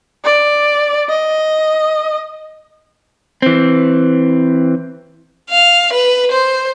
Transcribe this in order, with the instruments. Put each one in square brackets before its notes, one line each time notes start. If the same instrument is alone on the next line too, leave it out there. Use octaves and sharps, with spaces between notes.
[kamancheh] D5
D#5
[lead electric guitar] E3 C4
[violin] F5
B4
C5